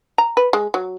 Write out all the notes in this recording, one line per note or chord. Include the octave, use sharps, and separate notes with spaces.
A#5
B4
G#3
F#3